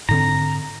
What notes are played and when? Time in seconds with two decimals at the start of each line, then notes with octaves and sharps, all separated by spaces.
0.09 G#2 D3 C4 A#5